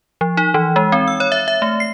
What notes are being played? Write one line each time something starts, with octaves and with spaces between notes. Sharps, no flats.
F3
D#4
E3
G#3
C4
E6
C#5
E5
E5
A3
C7